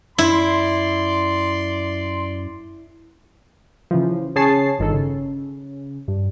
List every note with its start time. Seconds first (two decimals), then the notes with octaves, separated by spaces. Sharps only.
0.18 F#2 E4 D5 C6
3.91 C#3 E3 F3
4.36 C#3 G#4 C#5 A5 C7
4.79 G1 D#3 A4
4.93 C#3
6.08 G2